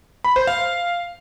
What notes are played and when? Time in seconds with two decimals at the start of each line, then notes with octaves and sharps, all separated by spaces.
0.24 B5
0.36 C5
0.47 F5